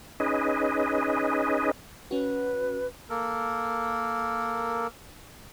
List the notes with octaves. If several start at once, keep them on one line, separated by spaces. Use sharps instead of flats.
C#4 D#4 G#4 B4 D#5
C#4 F#4 B4
A#3 A4 A#4